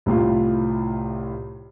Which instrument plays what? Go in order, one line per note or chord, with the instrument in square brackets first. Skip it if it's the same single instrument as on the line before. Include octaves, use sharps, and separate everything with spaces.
[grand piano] C2 A2 F4